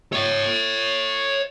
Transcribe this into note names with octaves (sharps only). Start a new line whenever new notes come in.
C#5 E5